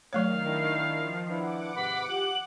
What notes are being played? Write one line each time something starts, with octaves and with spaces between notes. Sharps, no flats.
D#3 F#3 A3 C#5 F5
D4 E4 A#4
F3
D4 E4 B4 F#5 D6
G#2 C3 B4 B5
F4 G4 F#7